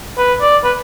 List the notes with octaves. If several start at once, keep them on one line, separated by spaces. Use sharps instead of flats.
B4
D5
B4